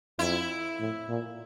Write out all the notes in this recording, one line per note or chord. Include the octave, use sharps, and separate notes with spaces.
F2 E4
A2
A#2